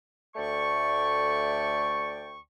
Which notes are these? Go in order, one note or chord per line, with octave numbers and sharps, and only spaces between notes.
D2 A3 D5 G5 C#6